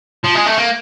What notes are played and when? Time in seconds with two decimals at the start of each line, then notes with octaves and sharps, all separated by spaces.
0.25 F3
0.36 G#3
0.47 A3
0.58 A#3